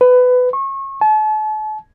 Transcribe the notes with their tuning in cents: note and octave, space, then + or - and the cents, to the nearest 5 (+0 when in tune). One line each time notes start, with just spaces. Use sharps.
B4 +20
C#6 -30
A5 -40